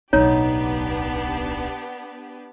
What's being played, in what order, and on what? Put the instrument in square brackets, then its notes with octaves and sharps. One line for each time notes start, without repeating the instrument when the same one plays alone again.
[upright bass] D1 B1 [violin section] B3 D4 G4 [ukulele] D#4 [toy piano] C#5